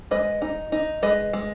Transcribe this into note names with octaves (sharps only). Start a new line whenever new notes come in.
G#3 B4 D#5
D#4
D#4
G#3 B4 D#5
G#3